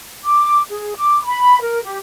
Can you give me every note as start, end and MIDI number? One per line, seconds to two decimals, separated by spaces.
0.24 0.61 86
0.71 0.94 68
0.97 1.22 86
1.25 1.61 83
1.61 1.83 70
1.84 1.99 67